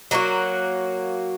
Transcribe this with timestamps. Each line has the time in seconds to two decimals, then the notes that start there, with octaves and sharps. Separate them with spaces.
0.11 F#3 A#3 D#4 F#4